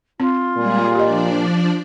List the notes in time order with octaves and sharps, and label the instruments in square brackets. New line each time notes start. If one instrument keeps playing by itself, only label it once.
[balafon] C4 [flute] F4
[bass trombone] A#2 [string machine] G3 G#3 G#4
[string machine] F3 D4 D5 [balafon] G4 D#5